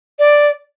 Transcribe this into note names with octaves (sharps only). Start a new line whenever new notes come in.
D5